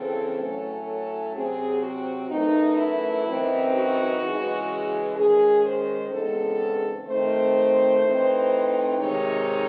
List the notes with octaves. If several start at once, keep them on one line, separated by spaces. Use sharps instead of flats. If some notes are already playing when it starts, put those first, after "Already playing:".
Already playing: C#3 E3 C4 A4
A2 F#3 A3 C#4
A4
C3 F#3 C4 G#4
F#4
F#2 E3 A3 D#4
E4
F#2 E3 C4 D#4
F#4
C#3 E3 G#3
D#3 G#3 C#4 G#4
C5
E2 C#3 G#3 C4 D#4 A4
D#3 A3 C4 D#4 C5
A2 E3 C4 D#4
C3 D#3 G#3 C4 D#4 C#5